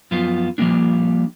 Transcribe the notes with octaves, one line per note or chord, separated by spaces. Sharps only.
F#2 F3 B3 F4
F3 G3 A3 A#3 D4